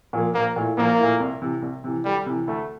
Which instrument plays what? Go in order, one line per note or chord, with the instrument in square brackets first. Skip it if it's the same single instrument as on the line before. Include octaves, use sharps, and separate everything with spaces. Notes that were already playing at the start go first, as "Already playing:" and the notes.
[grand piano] A#2 F3 A#3
[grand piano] A#1 [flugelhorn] A#3
[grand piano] A#2 A3 E4
[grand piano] A#1 [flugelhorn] A#3
[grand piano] A#2 A3 E4
C2
C3 E3
C2
C3 E3
[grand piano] D2 [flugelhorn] G3
[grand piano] C3 E3
[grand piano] D2 [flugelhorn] A3